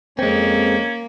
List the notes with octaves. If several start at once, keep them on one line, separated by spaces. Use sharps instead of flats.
F2 G#3 A#3 C4 C#4